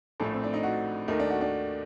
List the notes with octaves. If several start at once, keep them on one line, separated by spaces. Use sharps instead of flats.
A#1 A2 A3 A4
C4
D4
D#4
F#4
D#2 D#3 A3 D#4
D4
F#4
D4